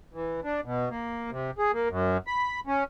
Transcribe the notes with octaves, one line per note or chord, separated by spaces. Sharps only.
E3
D4
B2
A#3
C3
G#4
A#3
F#2
B5
C#4